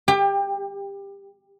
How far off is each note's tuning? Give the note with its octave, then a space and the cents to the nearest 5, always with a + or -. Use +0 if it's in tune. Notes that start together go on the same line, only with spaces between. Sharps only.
G4 +20 G5 +35